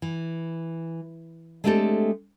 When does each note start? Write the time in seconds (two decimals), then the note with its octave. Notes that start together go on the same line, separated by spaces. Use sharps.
0.02 E3
1.64 G#3 A3 C4 D4 G4 A4